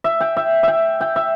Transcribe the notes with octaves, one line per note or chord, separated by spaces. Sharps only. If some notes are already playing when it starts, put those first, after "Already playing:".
E5
G5
E5
E5 G5
G5
E5